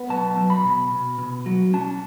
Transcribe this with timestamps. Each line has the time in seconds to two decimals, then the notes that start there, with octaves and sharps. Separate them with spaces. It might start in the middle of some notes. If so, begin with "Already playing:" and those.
Already playing: B3
0.09 B1 A5
0.37 F#3
0.50 B5
0.64 B2
0.91 B2
1.18 B2
1.46 F#3
1.73 C#4 A5